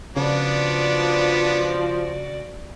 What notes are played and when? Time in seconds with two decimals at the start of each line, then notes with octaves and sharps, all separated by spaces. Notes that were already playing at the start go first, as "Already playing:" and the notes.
0.16 C#3 F3 B3 D4 F#4 D5